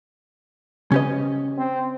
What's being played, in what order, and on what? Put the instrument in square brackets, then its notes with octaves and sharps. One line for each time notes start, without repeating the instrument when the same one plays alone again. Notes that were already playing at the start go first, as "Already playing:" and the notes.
[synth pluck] C#3 B4 [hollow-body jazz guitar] C#4 G4 D#5
[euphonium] C4